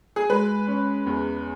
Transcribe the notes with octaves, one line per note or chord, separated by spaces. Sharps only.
G#4
G#3 B4
C#4
E2